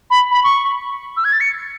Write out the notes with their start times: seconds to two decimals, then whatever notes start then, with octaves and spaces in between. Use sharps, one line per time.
0.10 B5
0.31 B5
0.44 C#6
1.17 E6
1.25 G#6
1.33 A6
1.40 C#7